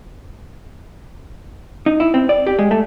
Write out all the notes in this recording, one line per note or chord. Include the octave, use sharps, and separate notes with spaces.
D#4
E4
C4
D5
G4
G#3
A3